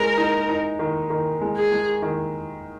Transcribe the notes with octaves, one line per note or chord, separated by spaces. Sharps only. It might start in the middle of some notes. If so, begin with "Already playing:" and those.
Already playing: G#3 A#4
D#4
D#4
D#3
D#3
G#3
G#4
G#3
D#3